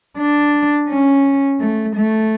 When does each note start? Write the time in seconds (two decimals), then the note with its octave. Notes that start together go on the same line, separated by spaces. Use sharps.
0.17 D4
0.88 C#4
1.60 A3
1.96 A3